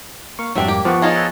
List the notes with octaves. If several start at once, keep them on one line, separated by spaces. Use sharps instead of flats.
A#3 A#4 F5 C#6
F2 G#2 F#3 G3 C4 D4 E5
A#3 G4
F3 B3 C5 F#5 C#6
D#4 F4 G#4 C#5 D#5 A5
E6 F#6